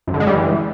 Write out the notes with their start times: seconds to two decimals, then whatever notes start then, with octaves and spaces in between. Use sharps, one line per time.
0.07 F#2
0.14 D3
0.20 G#3
0.27 G3
0.33 E3